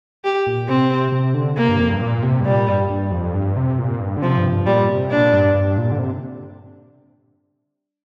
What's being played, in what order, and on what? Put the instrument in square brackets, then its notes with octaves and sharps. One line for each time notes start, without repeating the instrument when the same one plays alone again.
[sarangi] G4
[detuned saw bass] A#2
[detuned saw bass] C3 [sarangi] C4
[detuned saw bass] C3
D3
[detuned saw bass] C3 [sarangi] A#3
[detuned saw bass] G2
F2
G2
A#2
C3
G2
[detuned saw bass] A#2 [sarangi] G3
[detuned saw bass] G2
G2
F2
G2
C3
A#2
G2
D3
[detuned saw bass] C3 [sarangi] F3
[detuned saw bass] G2
G2
[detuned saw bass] A#2 [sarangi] G3
[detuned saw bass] C3
[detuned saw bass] A#2 [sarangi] D4
[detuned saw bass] G2
G2
A#2
D3
C3